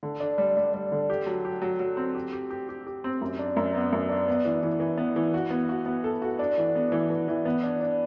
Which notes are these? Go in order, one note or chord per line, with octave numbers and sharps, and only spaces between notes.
D3
D4
G3
G3
G3
D3
G4
F#3
G4
F#3
F#3
C4
G4
G4
G4
G4
G4
C4
F#2
D4
F#2
B3
F#2
D4
B3
E3
E3
E3
B3
E3
F#4
B3
F#4
B3
A4
F#4
D4
E3
B3
E3
E3
E3
B3
D4
D4